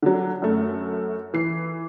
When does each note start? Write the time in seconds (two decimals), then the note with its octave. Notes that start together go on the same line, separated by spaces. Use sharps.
0.02 D3 F#3
0.42 F#2 A3
1.34 E3 C7